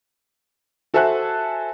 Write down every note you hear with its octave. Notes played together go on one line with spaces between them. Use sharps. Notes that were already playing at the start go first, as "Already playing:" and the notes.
F#4 A4 C5 E5 G#5 F#6